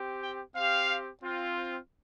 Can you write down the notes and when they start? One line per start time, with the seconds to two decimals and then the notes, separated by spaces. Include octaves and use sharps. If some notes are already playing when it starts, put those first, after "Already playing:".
Already playing: C4 G4
0.21 G5
0.55 C4 G4 F5
1.23 C4 F4